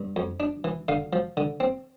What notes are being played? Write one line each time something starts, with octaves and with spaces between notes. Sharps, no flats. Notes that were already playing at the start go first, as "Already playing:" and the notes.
Already playing: G2
F2
D4
E3
D3 F5
F3
D3
C4